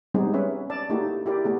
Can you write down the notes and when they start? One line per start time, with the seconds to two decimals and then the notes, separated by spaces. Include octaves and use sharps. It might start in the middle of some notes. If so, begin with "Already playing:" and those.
0.14 G3 G#3 B3 C4 D#4 G#4
0.34 C#4 B4 C#5 E5
0.70 D5 A5
0.90 A3 A#3 D#4 E4 F#4 G4
1.26 E4 G4 A#4 D5
1.44 A3 B3 G#4